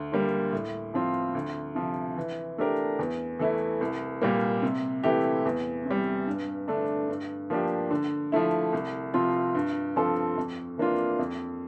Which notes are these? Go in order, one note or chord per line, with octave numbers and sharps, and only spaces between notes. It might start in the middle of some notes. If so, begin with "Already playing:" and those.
Already playing: D2
D3 G3 A#3
A2
F3 C4 F4
D2
C3 F3
E3
A3 D4 G4 A#4
E2
E3 A3 E4
C2
A#2 G3 A#3
C3
E3 A3 E4 G4
E2
C3
G3
G2
D3 A3 D4
G2
F3 A#3 D4 G4
D3
F3 A3 E4
C2
C3 F3 C4 F4
G2
F3 C4 F4 A4
F2
E3 A#3 D4 F4
F2